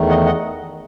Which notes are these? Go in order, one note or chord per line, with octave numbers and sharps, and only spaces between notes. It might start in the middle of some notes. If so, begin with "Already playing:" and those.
Already playing: E2 D#3 A3
D#5 F#5
D#5 F#5